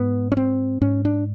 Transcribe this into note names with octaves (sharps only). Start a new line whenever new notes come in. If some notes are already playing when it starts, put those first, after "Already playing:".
Already playing: G#2 B3
C#4
C4
G#2 C#4
D4